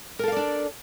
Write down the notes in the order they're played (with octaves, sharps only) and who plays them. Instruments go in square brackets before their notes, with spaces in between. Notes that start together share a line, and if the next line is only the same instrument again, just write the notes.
[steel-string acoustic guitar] A#4
A4
F5
D5
D4